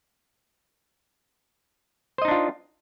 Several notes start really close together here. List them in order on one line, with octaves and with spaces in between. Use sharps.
C5 D#5 D#4 D4 F4